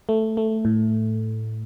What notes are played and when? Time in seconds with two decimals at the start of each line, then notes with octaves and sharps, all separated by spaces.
0.09 A3
0.37 A3
0.65 A2